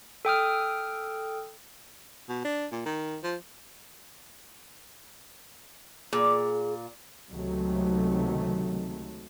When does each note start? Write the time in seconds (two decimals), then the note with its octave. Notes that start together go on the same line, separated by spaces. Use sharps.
0.25 A4 G5 D#6 F6
2.29 B2
2.44 D4
2.72 A#2
2.86 D#3
3.23 F3
6.13 A#2 G#4
7.30 C#2 C3 D#3 F#3 A3